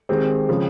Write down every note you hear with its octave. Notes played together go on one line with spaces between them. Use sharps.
D#3 G#3 C4 G4
C#3 F3 G#3